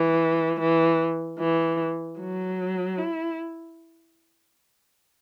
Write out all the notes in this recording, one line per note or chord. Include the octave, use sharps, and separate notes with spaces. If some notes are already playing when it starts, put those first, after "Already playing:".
Already playing: E3
E3
E3
F#3
E4